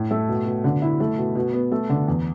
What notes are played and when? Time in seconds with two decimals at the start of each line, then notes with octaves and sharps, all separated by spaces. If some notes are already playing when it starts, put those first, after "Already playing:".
Already playing: A2
0.11 A3
0.28 B2
0.46 B2
0.64 D3
0.82 E4
1.00 A3
1.18 B2
1.35 B2
1.53 B3
1.72 A3
1.89 D3
2.08 E2